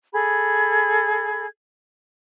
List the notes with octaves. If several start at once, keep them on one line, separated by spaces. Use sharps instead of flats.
G#4 A4 B5 G#6